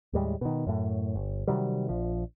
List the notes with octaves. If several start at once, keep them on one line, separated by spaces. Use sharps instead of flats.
D#2 A2 G3 G#3
B2 D#3
F#2 A2
G1
C3 D#3 F#3 G3
A#1 F3